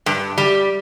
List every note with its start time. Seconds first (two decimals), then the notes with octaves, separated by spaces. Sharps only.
0.06 G2
0.38 G3